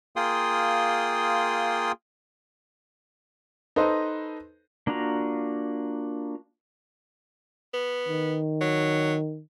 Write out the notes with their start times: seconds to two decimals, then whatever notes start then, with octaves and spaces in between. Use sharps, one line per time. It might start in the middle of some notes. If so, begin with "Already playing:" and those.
0.16 A#3 F4 G#4 G5 C6 D#6
3.76 D#4 A4 B4 C5 D#5
4.87 A#3 D4 F4 F#4 A#5
7.74 B3
8.08 D#3
8.61 F#3